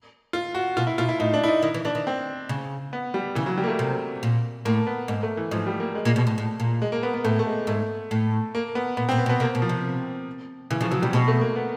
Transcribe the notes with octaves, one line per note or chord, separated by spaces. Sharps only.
F4
F#4
B2 F4
E4
B2 F4
E4
A2 D#4
D4
E4
D#4
D#3 E4
E3
E3 D4
D#3
C4
C#3
B3
G3
C#3 E3
F#3
G3
A#3
A3
C3
A#2
A2 A#3
B3
G#2 A#3
A3
E3
G#2 F3
G3
A#3
G#3
A#2
B2
A2
A2
A#2
G#3
A#3
B3
B3
A2 A3
A3
G#3
G#2 A3
A2
A#3
B3
A#2 B3
C4
A#2
B3
B2
B3
C3 A#3
B2
F3
C3
C#3 E3
C#3 F3
C#3 F#3
C3 G3
B2 G#3
A3
A#3
B3